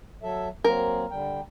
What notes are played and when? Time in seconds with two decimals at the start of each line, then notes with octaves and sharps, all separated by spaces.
0.23 F#3 A4 E5
0.64 F#3 A#3 C4 A#4
1.11 D3 G3 G5